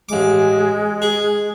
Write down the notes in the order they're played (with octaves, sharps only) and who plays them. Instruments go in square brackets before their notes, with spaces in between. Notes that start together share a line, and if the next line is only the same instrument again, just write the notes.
[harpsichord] A1 D6 [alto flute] G#3
[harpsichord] G#4